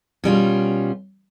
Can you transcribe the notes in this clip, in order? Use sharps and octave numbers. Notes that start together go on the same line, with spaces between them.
B2 G3 C#4 F4